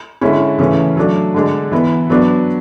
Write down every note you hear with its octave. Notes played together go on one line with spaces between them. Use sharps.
D3 G#3 C#4 E4
C#3 E3 A3 C#4
F#3 A3 D4
D3 G#3 D4
E3 B3 E4
F#3 B3 D4